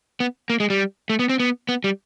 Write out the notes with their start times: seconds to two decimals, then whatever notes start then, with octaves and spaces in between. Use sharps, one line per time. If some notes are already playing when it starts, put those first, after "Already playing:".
0.20 B3
0.50 A#3
0.60 G#3
0.70 G3
1.10 A3
1.19 B3
1.29 C4
1.40 B3
1.69 B3
1.84 G3